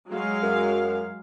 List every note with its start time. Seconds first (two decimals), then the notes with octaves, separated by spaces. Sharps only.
0.10 F#3 G#3 F5
0.42 F#2